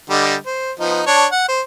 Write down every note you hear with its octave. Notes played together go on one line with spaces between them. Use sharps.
D3 G3 D#5
C5
F3 B3 D#4
D4 C#5
F#5
C5